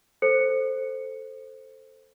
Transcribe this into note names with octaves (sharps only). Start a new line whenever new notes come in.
A4 C5 C#7